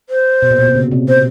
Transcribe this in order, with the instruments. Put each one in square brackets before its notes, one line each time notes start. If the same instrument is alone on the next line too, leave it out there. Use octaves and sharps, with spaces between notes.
[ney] C5
[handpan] B2
A#2
B2
C3
C#3
C3
[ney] C5